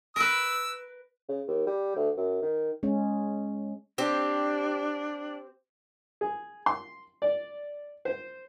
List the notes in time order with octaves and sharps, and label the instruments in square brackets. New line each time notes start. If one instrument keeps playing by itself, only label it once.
[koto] A#4 B4 [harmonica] E6
[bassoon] C#3
D#2
G3
D2
F#2
D#3
[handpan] G#3 C#4
[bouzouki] C4 G4 [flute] D4
[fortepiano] G#4
C6
D5
C5